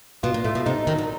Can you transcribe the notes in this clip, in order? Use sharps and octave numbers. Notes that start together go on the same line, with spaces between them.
B2 F4
A#2
A2 A3
B2
C3 D#4
D#3 F#3
D3